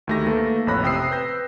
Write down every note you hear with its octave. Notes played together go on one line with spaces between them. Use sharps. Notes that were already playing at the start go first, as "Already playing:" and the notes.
D2 D#3 A3 G4 A#6
A3 A#3 A4 B4
A1 F2 C#5 B5 F#6 A#6
C3 C5 G5 D#6 E6 C7
B4 G6 A#6